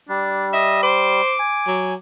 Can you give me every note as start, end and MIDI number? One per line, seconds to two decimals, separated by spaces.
0.09 1.21 55
0.09 0.48 62
0.53 0.82 75
0.53 0.81 76
0.83 1.36 72
0.83 1.99 86
1.39 1.94 80
1.67 1.95 54